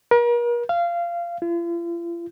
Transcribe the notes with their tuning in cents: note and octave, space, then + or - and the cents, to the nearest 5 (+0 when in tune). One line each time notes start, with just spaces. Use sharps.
A#4 +40
F5 -20
F4 -45